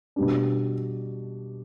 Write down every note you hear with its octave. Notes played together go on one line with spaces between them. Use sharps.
B2 G3 D4